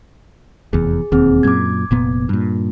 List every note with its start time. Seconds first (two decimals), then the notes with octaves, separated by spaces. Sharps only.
0.73 F1 E2 G#4
1.12 E1 D#2 C4 G#4
1.43 F#2 A#2 D6 G#6
1.91 F1 A#2 B3
2.29 G2 A#2